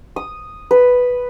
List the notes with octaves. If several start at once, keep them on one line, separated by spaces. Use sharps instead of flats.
D#6
B4